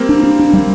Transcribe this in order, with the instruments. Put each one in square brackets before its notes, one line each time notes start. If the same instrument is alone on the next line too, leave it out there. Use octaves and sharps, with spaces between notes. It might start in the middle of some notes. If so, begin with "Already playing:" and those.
Already playing: [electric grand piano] G3 A#3 C4
[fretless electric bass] D4
D4
D4
G3